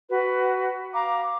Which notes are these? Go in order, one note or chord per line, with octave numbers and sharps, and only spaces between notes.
F#4 B4
F5 A#5 D6